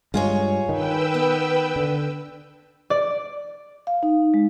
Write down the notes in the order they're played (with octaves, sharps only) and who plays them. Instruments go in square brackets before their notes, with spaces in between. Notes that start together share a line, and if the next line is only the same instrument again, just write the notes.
[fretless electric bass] G2 G#3 [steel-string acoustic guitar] F4 G#4 C#5
[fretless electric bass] D#3 [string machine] B4 G5 E6
[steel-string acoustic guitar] B3
[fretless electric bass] D3
[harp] D5
[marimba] F5
D#4
G#3